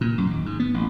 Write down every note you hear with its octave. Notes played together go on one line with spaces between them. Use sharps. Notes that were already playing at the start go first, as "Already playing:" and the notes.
A#2
F#2
D#2
G#2
B3
A1